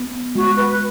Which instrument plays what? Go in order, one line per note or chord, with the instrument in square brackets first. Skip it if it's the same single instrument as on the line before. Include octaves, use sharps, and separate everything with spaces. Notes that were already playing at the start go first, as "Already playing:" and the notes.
Already playing: [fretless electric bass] B3
[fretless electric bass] G#3 [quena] F#4
[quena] B4